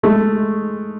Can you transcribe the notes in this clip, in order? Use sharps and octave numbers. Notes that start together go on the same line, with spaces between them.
G#3 A3